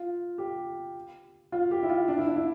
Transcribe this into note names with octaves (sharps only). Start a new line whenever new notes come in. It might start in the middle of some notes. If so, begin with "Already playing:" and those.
Already playing: F4
G4
F4
G4
E4
F4
D4
E4
D4
E4